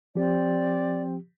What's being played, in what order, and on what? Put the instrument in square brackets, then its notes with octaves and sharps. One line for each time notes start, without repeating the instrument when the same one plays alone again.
[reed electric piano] F3 G4 [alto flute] C4 [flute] D5